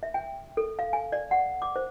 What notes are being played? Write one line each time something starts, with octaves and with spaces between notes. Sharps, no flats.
E5
G5
A4
F5
G#5
D5
F#5
D6
C5